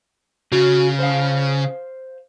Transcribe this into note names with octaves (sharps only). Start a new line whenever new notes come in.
C#3 F#4
C5 F5